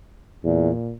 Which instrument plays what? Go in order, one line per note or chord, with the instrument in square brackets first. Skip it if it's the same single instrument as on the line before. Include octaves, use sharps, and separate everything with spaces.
[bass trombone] E2 [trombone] A#2